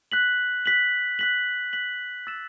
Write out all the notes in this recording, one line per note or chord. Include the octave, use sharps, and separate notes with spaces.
F#6 B6 F#7
F#6 B6 F#7
F#6 B6 F#7
F#6 B6 F#7
E6 A6 E7